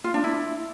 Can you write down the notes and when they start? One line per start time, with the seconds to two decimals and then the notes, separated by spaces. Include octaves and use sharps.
0.04 F4
0.14 D4
0.24 E4